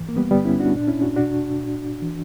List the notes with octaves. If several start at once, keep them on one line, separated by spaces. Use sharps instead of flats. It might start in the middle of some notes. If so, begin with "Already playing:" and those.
Already playing: G2 E3
A#3
G3 B3
G2 D3 G3 B3
C#4 E4
D4 F#4
A#2 D4
C#4 E4
D4 F#4
E2 B2 D4 F#4
A#2
E3